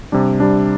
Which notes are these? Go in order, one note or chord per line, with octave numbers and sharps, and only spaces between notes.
C3 G3 D4
C3 G3 D4